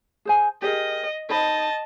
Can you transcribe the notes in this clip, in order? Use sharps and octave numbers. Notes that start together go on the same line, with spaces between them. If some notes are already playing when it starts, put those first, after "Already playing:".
G#4 C5 G#5
G4 G#4 A#4 D#5
D#4 C5 D#5 A5 B5